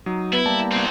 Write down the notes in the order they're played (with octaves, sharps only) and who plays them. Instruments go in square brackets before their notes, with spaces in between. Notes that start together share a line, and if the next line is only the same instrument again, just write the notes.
[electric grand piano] F#3 [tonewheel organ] D#4
[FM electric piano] B3 B4 [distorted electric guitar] E4
[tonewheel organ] G3 A#3 [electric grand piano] A5
[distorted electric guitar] C2 C4